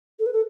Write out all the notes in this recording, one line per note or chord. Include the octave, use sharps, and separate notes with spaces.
A4
B4
A4